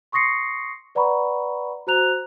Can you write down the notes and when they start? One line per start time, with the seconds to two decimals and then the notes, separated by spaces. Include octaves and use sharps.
0.12 C6 C#6 D#6 A#6 C7 C#7
0.95 B4 D5 F#5 A#5 B5 C#6
1.87 F#4 C5 A#5 F#6 F7